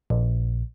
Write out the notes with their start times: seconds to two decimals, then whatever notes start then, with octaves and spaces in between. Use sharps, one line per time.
0.10 A#1